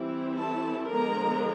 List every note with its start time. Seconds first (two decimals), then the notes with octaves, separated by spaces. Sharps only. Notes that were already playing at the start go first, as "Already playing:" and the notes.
Already playing: E3 G3 C4 E4
0.36 A4 A5
0.88 D3 F3 G#3 B3 A#4 A#5